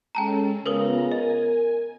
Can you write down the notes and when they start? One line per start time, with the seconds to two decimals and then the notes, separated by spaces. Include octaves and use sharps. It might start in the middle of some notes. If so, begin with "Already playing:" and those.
0.15 G#3 C#4 A4 G5 A5 A#5
0.66 C#3 B3 F4 A#4 B4 A#5 D#6
1.11 A#4 D#5 G#5